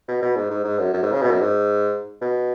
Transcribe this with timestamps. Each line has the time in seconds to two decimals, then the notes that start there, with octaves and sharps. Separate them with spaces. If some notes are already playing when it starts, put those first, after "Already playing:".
0.08 B2
0.22 B2
0.36 G#2
0.50 G#2
0.64 G#2
0.79 F#2
0.93 F#2
1.03 G#2
1.12 C#3
1.22 B2
1.31 F#2
1.41 G#2
2.21 B2